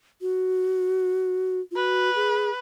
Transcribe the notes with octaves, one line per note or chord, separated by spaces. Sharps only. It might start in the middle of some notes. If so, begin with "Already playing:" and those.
F#4
F4
F#4 B4
G#4